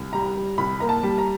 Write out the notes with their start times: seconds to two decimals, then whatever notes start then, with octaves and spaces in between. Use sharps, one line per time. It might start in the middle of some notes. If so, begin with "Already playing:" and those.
Already playing: C2
0.13 G3 A#5
0.36 G3
0.58 C2 B5
0.80 A#3 A#5
0.89 A5
1.03 G3
1.18 A#5